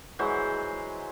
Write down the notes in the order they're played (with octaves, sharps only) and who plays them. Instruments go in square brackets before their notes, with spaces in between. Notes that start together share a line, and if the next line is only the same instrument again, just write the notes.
[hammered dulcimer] E3 F#3 G#3 C5